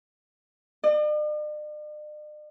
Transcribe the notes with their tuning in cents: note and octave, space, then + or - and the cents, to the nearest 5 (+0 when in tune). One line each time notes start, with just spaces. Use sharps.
D5 +45